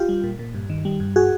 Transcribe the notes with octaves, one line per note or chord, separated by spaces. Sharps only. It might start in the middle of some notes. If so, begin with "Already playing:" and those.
Already playing: F4 G4
G3
A#2
A#2
G2
D#3
G3
G2
F#4 G#4